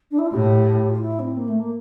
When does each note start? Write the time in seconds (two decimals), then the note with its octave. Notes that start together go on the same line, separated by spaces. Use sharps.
0.11 D4
0.18 E4
0.26 F4
0.33 A2 G4
0.90 F4
1.02 E4
1.19 C4
1.37 A#3
1.48 A3
1.59 A#3